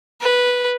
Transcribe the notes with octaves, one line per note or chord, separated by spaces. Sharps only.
B4